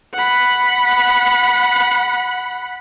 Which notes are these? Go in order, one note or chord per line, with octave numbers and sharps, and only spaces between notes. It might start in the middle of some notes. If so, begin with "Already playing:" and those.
F#5 B5